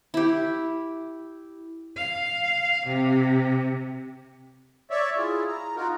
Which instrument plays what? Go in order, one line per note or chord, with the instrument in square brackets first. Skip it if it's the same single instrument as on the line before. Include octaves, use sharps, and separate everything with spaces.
[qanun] E4 G4
[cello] F5
C3
[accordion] C#5 D5 E5
E4 F4 G#4
A#5
D#4 F4 F#4 A#4